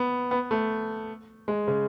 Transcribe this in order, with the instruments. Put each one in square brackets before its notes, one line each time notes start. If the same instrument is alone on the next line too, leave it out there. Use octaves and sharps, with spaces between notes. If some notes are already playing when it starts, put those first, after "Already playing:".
Already playing: [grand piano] B3
B3
A3
G#3
C#3